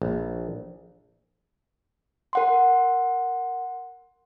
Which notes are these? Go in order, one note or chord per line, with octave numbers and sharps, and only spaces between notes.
A#1
A#4 F#5 C6